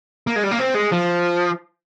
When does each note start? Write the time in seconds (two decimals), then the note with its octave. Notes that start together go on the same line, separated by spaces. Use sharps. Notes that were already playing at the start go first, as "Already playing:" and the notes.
0.27 A#3
0.36 G#3
0.44 G3
0.52 A#3
0.60 C4
0.75 G#3
0.92 F3